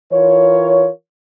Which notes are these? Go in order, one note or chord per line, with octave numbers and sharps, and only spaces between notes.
E3 F4 A#4 C#5